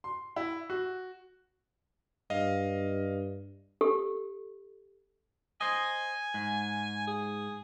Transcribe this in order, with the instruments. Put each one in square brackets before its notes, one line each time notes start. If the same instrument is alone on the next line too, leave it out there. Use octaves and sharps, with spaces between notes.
[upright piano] C6
E4
F#4
[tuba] G2 [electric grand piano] D#5 F5
[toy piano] G4 A4
[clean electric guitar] C5 D#5 [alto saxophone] G#5
[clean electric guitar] G#2
[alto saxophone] G#4